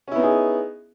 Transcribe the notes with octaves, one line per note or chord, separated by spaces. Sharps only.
B3 C#4 D#4 E4 G#4